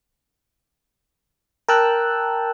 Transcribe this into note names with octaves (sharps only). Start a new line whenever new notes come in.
A#4 G5 A5 E6 F#6